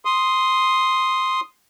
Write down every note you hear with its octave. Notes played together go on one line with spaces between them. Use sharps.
C6 D#6